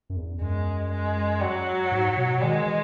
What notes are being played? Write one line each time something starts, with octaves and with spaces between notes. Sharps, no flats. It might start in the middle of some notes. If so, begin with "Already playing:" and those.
F#2
E2
F#2 G#3
G#3
F#3
G#2
B2
D#3 G#3
E3